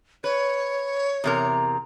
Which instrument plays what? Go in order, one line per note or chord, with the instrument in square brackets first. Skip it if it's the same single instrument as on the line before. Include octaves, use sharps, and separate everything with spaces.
[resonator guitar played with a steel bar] B4 [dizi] C#5
[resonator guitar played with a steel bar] E2 C3 A#4